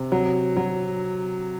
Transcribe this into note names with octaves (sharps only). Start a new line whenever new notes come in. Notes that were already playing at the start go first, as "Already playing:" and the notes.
Already playing: C3
F#3
F#3